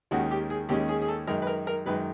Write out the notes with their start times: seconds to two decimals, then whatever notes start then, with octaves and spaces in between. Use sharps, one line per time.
0.11 D#2 D#3 G#3 C#4 F#4
0.31 G4
0.50 G#4
0.69 D#2 D#3 G#3 C#4 G4
0.89 G#4
1.02 G#4
1.08 A4
1.27 F#2 D#3 G#3 A#4
1.42 B4
1.47 A#4
1.67 A#4
1.86 F#2 D#3 G#3 B4